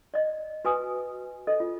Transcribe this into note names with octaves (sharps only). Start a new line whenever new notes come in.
D5 D#5
F#4 B4 G#5 D#6
A4 D#5
F4